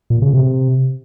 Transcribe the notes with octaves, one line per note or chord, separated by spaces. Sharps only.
A#2
C#3
C3